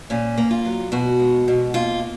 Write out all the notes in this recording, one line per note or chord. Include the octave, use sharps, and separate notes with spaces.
A#2 C#4
A#3
F4
F#3
B2 F#4
G#3
B2
A#3 F4